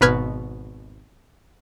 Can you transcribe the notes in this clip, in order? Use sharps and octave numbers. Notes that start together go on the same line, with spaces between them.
G#1 B2 B4 F6 G#6